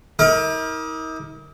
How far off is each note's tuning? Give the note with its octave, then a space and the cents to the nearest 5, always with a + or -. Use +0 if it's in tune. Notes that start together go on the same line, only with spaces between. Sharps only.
D#4 +45 A#4 +0 D6 +45